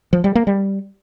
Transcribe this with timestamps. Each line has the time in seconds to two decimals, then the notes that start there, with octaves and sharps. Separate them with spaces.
0.13 F3
0.24 G3
0.35 A#3
0.47 G3